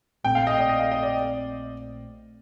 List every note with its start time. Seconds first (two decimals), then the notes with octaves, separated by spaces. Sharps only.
0.24 A#1 A#2 A3 C4 G5
0.35 F5
0.47 D#5
0.58 D5
0.69 D#5
0.80 F5
0.91 D#5
1.03 D5